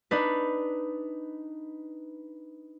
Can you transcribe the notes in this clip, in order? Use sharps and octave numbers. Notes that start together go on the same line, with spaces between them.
D4 D#4 B4